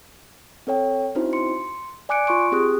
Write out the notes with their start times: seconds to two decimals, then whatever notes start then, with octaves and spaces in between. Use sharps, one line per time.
0.67 C4 A4 C#5 G5
1.15 C4 C#4 D#4 E4 F#4 C5
1.33 C6 C#7
2.09 D5 G#5 D6 F#6 C#7 D7
2.27 F4 C6 C#6 D7
2.52 C4 G4 G#4 D#6 F#6